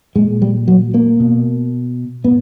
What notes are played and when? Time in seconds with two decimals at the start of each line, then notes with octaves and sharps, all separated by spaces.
0.15 A#2 G#3
0.42 G3
0.68 F#3
0.94 A#3
1.20 B2
2.24 A2 B3